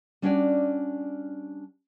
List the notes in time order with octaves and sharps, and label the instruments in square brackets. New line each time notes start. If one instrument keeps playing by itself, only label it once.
[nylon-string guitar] G3 C#4 D4 F#4 C#5 D5